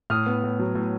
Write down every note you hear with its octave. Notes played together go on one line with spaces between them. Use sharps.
A2 D#6 F6
B3
A2
F#3
A2